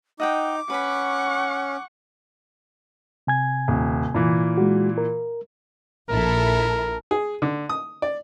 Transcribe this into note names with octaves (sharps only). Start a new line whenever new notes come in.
D#4 D#5 F#5 G5 D6
C#4 B4 F#5 B5 C#6
C3 G#5 G#6
D#1
A#2 E3
G#3 F#4
A#4
A#1 E4 A4 A#4
G#4
D3
D#6
D5